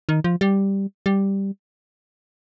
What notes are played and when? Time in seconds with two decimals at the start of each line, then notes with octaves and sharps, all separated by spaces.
0.09 D#3
0.24 F3
0.41 G3
1.06 G3